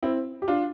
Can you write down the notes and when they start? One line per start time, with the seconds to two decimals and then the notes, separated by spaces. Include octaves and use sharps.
0.03 C4 E4
0.42 G4
0.48 D4 F4